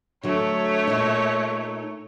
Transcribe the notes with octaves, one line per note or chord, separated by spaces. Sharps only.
D3 F#3 A3 C#5
A#2 D#4